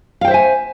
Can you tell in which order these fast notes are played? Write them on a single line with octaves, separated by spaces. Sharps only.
F5 G5 C5 E5 G#5